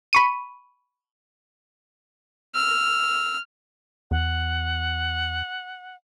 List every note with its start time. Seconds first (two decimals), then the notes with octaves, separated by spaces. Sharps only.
0.13 B5 C#6 D#7
2.55 E6 F6
4.11 E2 F#5